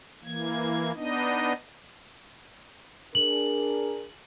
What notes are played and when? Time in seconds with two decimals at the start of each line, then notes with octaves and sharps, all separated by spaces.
0.24 E3 A#3 G#6
0.95 B3 D4 D#4 D#5
3.15 D4 G#4 A#4 F#7